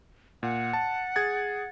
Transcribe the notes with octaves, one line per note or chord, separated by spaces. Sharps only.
A#2 F#5
A5
G#4 G#6 A6